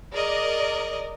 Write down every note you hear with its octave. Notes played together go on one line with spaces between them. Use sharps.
G#4 A#4 D5 D#5